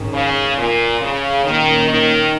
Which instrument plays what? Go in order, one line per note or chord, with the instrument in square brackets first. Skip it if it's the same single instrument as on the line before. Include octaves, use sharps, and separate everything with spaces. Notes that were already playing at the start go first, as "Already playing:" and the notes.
Already playing: [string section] G#2 D#3 C#4
[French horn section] C#3
A#2
C#3
[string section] A#2 A#3 C#4 [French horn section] D#3
[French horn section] D#3